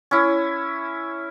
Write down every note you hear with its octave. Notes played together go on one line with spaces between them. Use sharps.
C#4 E4